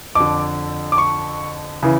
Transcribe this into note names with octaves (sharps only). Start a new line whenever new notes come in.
F2 D3 D6
D6
C#6
C#3 E3